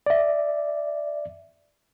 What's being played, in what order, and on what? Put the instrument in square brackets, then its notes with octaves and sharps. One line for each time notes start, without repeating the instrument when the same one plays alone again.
[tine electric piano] D5 E5